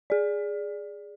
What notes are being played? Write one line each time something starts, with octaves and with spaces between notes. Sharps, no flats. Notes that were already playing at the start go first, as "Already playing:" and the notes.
G#4 D5